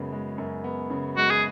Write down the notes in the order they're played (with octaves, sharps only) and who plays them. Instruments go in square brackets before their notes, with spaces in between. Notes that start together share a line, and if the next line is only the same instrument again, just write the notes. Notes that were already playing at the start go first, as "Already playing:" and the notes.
Already playing: [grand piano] F#2 C#3 G#3 B3
G#3
F#2
B3
C#3
[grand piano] G#3 [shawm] F#4
[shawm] G#4